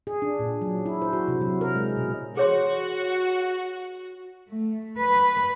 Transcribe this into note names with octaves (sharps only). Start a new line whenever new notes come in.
G#4
D4
A#2
F#3
E4
C5
F#4
C3
F#3
A#4
G#3
B2
F#4 G#4 C#5 C6
A3
B4